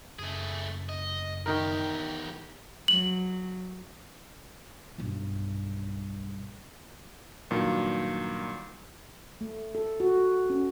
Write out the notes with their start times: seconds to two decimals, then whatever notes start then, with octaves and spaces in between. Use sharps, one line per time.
0.19 F#1 A3 G#4
0.89 D#5
1.46 E2 D#3 D#4 G4 A#4
2.88 F#3 F#7
4.98 B1 G2
7.50 G2 A#2 D#3 F#3
9.41 A3
9.75 A4
10.00 F#4
10.50 C#4